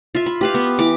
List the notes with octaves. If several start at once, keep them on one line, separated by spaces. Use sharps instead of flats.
F4 E5
B5
G4 B4 F5
B3
E3 D6